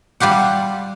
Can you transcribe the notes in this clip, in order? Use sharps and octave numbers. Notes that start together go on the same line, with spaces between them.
G3 F4 G4 F#5